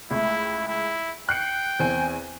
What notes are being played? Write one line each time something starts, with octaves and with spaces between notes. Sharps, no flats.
C#2 A3 E4
E4
G5 F#6 C7 C#7
E2 C4 G#5